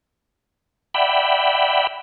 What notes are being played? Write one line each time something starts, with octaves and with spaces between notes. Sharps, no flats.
D5 E5 F#5 G5 B5